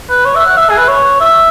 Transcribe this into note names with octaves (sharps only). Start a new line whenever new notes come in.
B4
C#5
E5
F#5
E5
G#4
B4
C#5
E5